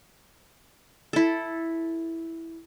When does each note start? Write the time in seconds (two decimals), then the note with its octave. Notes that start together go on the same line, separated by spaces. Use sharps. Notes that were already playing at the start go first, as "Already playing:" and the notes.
1.13 E4 A4